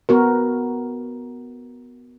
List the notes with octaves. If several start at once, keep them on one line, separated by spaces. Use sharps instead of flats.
B3 F#4 A#4